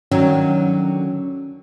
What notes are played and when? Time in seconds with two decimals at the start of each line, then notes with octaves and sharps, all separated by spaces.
0.12 D3 D#3 F#3 C#4